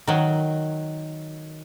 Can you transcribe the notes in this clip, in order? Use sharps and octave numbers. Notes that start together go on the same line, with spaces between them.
D#3 F#3